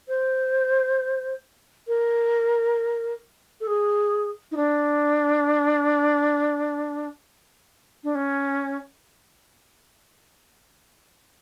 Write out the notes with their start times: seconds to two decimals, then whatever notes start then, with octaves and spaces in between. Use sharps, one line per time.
0.08 C5
1.88 A#4
3.61 A4
3.67 G#4
4.52 D#4
4.57 D4
8.04 D4
8.15 C#4